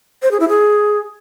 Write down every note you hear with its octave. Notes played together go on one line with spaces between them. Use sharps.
C5
G#4
E4
G#4